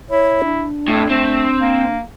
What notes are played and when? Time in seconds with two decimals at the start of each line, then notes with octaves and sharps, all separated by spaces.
0.10 E4 C#5
0.45 D4
0.88 F2 A2
1.10 A3 C4
1.61 A#3